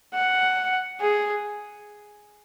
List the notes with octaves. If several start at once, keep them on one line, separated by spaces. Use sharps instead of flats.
F#5
G#4